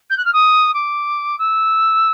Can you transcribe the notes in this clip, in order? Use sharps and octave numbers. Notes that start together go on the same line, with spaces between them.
G6
F#6
F6
D#6
D6
E6